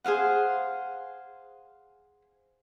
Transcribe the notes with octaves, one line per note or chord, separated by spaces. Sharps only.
G#4 C5 F5 F#5